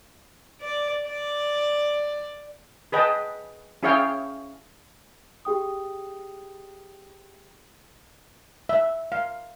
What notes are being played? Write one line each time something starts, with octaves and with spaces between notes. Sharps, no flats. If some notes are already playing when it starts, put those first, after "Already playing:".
D5
D5
G#4 B4 D#5 G5 A5
C#4 E4 G#4 C#5 F5 G5
G4 G#4 G5 D#6
E5
F5